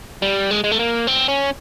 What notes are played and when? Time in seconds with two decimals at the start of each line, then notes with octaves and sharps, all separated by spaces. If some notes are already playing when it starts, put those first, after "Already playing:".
0.22 G3
0.51 G#3
0.64 G#3
0.72 A3
0.79 A#3
1.07 C4
1.28 C#4